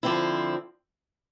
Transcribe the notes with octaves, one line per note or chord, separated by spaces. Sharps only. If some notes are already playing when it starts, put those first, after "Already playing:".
D3 F3 C4 E4